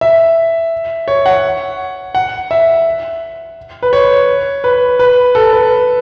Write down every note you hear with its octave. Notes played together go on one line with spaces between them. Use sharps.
E5
C#5
F#5
F#5
E5
B4
C#5
B4
B4
A4
B4